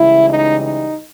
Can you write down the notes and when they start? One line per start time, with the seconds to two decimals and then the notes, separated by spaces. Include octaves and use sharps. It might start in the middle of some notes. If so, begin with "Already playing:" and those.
Already playing: C#2 C#3 E3 G3 E4
0.29 D#4
0.61 D#4